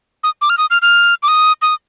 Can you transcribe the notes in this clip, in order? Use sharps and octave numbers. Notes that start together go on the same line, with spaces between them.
D#6
D6
F6
D#6
F6
F6
D6
D#6
D#6